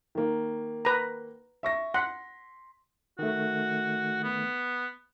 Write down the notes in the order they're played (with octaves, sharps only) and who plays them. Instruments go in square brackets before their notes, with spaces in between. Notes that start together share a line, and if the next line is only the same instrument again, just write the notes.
[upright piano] D#3 A#3
[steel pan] B4 A#5
[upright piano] E5 C#6 A#6
[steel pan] F#5 [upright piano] C6 B6
[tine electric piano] D#3 A3 [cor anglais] F#4
[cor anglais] B3